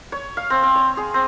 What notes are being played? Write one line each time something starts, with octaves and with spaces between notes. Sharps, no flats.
C#5
F5
C4
C4
C#5
G#4
C4